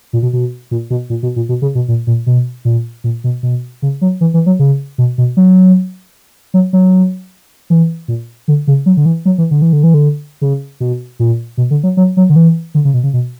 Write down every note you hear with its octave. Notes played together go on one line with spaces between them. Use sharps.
A#2
B2
B2
A#2
B2
A#2
B2
A#2
B2
C#3
B2
A#2
A#2
B2
A#2
A#2
B2
B2
C#3
F#3
E3
E3
F#3
C#3
B2
B2
F#3
F#3
F#3
E3
A#2
D3
C#3
F#3
D3
E3
F#3
E3
D3
E3
D3
E3
D3
C#3
B2
A#2
B2
D3
F#3
F#3
F#3
D3
E3
D3
C#3
B2
C#3
B2